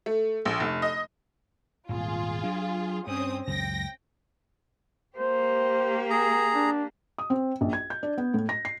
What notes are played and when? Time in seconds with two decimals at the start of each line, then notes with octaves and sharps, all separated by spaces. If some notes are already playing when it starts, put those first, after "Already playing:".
0.06 A3
0.45 A#1
0.60 F1
0.82 D#5
1.89 D#1 G#1 F4 G#4
2.44 F#3 D4
3.07 G2 C4 C#4 D#6
3.47 C#2 F#2 G5 A#6
5.17 A#3 G4 C5
6.10 G#4 A#5
6.55 D4
7.18 D#6
7.30 C4
7.61 A#1
7.73 G#6
7.90 G6
8.03 D4
8.18 B3
8.34 A2
8.49 A#6
8.65 C7